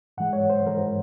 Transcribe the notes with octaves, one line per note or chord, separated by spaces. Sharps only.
G#2 E3 G#3 F#5
C#5
C5
G#2 E3 G#3 A#4